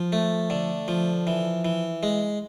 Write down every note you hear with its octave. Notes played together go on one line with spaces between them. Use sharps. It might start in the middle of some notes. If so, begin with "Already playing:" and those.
Already playing: F3
A3
D3
F3
E3
E3
G#3